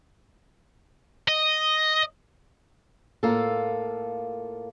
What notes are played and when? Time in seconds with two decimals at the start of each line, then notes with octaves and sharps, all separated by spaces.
1.28 D#5
3.23 A2 A#3 F4 A4